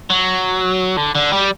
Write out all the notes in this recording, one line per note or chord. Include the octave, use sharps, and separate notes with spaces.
F#3
D3
D3
G3